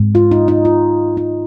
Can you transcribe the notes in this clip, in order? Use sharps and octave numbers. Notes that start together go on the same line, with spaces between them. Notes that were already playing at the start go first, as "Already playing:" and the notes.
Already playing: G#2 G#3 C4
F4
D#4
D#4
F4
D#4